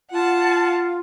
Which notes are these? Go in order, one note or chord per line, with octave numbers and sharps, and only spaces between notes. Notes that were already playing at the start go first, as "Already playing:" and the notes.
F4 F#5 A5